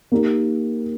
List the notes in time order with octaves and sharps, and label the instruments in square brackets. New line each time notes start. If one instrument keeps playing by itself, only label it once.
[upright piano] A#3 D#4 G4 A#4